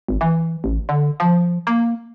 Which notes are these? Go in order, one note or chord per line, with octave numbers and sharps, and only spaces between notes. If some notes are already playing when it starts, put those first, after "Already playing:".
G#1
E3
A1
D3
F3
A#3